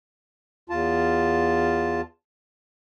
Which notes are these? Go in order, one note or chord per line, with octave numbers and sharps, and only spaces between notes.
E2 F4 A5